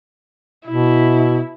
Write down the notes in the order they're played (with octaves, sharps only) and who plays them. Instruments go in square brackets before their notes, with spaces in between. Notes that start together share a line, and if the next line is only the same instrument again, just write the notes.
[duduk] B2 [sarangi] E4